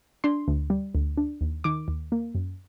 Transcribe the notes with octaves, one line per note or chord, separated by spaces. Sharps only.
D4 C6
D2
G3
D2
D4
D#2
D#3 D6
D#2
A#3
F#2